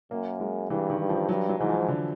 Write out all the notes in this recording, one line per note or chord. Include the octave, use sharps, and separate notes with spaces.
F#2 A#3
G#3
G2 E3
D#3
G2
F3
G2 F#3
F#3
G#2 E3
F3
D3